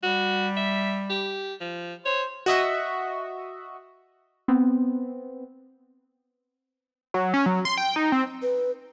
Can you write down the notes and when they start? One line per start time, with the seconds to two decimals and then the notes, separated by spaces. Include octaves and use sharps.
0.03 G3 F#4
0.57 E5
1.10 G4
1.61 F3
2.06 C5 C#5
2.46 F#4 D#5 E5
4.48 B3 C4
7.14 F#3
7.34 C#4
7.46 F#3
7.65 C6
7.78 G5
7.96 D#4
8.12 C4
8.42 B4